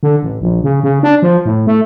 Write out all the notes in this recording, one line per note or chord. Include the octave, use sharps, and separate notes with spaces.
D3
A1
A#1
C#3
C#3
D4
F3
A2
A3